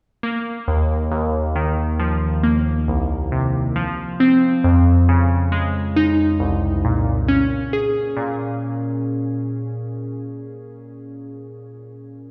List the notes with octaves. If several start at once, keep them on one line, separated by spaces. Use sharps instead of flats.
A#3
D#2
D#2
D#3
F3
A#3
C2
C3
F3
C4
F2
C#3
G#3
D#4
C2
A#2
C#4
G#4
A#2